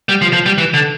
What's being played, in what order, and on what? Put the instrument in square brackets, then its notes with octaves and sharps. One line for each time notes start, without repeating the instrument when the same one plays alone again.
[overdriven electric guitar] G3
F3
F3
G3
E3
D3